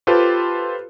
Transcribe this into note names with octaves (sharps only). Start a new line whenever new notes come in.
F4 G4 A4 B4 C5